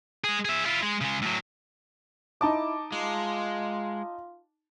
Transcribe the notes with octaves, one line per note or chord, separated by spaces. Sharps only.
G#3 G#4
G#4 E5
E4 F4
G#3
C#3 G#3
A2 F#3
D#4 E4 A5 D6
G#3 F4